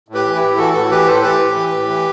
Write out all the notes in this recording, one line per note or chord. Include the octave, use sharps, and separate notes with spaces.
A2
G4 B4
E3
E4 G4
A2
E3 F#4 A4
A2 F#4 A4
E3 G4 B4
A2 A4 C5
E3 G4 B4
A2
E3
A2
E3